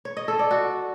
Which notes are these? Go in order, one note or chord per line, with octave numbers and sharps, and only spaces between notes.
C#5
D#5
A4
D5
F#4